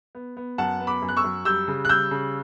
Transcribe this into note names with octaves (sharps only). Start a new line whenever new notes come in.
B3
B3
F#2 F#5 A5
B3
B5 D6
F#2
F#6
C#6 E6
F#2
G3 E6 G6
C#3
F#6
G3 E6 G6
C#3